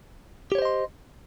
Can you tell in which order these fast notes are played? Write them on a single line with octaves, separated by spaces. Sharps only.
G4 C#5 C5 D#5 C6